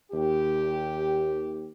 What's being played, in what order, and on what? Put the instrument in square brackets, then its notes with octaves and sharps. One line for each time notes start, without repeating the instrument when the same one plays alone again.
[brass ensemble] D#2 G4